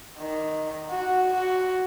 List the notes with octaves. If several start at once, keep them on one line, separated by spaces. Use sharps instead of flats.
D#3
F#4
F#4